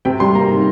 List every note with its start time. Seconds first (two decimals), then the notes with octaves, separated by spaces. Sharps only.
0.05 C3 G5
0.20 G3 C6
0.35 A#3 A#5
0.50 D#3